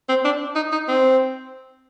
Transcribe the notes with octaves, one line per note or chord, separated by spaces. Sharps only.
C4
D4
D#4
D#4
C4